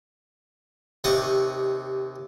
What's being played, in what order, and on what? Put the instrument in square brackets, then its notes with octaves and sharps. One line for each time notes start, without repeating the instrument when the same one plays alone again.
[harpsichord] D#2 C3 D5 D#5 C#6 D#6